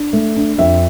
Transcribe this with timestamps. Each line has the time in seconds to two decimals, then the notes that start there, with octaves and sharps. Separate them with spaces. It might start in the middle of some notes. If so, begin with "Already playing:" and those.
Already playing: D4
0.13 A3
0.36 D4
0.59 F2 E5